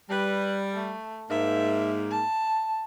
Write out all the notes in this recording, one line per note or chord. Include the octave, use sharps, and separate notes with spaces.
G3 B4
A3
G#2 A#3 E5
A5